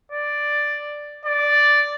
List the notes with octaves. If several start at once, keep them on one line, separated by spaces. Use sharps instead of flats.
D5
D5